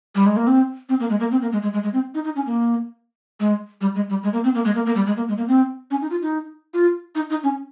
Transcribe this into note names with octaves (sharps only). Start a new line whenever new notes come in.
G3
G#3
A#3
C4
C4
A#3
G#3
A#3
C4
A#3
G#3
G#3
G#3
G#3
C4
D#4
D#4
C#4
A#3
G#3
G3
G#3
G3
G#3
A#3
C4
A#3
G#3
A#3
A#3
G3
G#3
A#3
G#3
A#3
C4
C#4
D#4
F4
D#4
F4
D#4
D#4
C#4